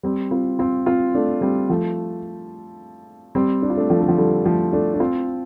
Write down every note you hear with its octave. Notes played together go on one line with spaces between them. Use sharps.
G3 C4
C4 F4
C4 F4
C4 F4
A3 D4
G3 C4
F3 A3
G3 C4
D4
F4
A3 D4
F3 A3
D3
F3
D3 G3
F3 A3
A3 D4
D4
C4 F4